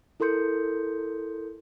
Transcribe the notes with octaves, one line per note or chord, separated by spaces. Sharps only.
E4 A4 A#4 C6 G6 C#7